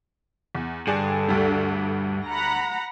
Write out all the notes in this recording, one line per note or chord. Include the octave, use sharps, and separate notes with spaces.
E2
G2 D3 G#4 A4 D5 G#5
D2 G3
F#5 A#5 B5